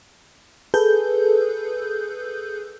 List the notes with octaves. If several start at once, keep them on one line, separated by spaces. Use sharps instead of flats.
G#4 A4 B4 G6